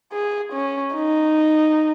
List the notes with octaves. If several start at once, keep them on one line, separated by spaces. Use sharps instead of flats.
G#4
C#4
D#4